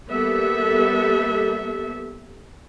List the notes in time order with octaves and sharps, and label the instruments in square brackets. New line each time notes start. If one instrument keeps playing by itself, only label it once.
[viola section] G3 A#3 B3 A4 E5